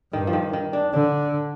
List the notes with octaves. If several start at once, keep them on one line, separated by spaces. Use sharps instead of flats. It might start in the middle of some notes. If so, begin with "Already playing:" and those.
G2 D#3
F3
D#3
D#3
D4
D3 D4